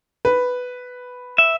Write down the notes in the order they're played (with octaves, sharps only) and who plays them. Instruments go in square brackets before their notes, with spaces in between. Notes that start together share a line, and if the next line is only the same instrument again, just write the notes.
[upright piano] B4
[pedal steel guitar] E5